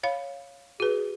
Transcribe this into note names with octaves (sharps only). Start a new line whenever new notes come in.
C#5 F5 B5
F#4 G#4 B4